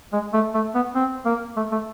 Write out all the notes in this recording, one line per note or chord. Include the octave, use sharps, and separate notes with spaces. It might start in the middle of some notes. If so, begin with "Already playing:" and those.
G#3
A3
A3
B3
C4
A#3
A3
A3